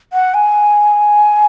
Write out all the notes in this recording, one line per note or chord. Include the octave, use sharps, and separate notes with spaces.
F#5
G#5